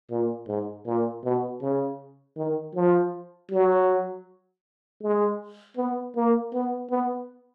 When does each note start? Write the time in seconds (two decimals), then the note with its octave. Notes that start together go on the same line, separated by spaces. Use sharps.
0.10 A#2
0.48 G#2
0.86 A#2
1.24 B2
1.61 C#3
2.37 D#3
2.74 F3
3.51 F#3
5.02 G#3
5.77 B3
6.16 A#3
6.53 B3
6.90 B3